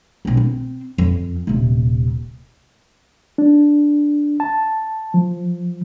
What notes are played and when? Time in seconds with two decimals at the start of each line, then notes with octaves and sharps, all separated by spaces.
0.25 B1 B2
0.37 C4
0.98 F2
1.47 D#1 C3
3.38 D4
4.40 A5
5.14 F3